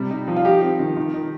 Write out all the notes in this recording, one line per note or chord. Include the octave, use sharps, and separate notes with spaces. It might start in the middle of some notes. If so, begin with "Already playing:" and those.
Already playing: C3 G3
D#4
F3
F4
D#4 G4
C4
D#3
D#3
D#4